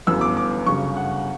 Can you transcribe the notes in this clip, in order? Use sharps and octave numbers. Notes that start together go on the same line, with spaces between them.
G1 F#2 E3 B3 E6
D6
D6
G1 F#2 C#3 C#6
F#5